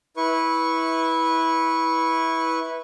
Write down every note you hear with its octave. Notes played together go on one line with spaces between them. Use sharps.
E4 B4 C#6